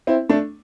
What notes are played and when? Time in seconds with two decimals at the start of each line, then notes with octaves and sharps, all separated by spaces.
0.07 C4 E4
0.29 A3 D4